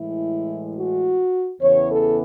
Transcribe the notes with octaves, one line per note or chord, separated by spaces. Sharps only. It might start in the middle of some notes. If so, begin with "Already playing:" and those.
Already playing: A2 E3 G#3 E4
F#4
E2 C#3 E3 B3 C#5
A4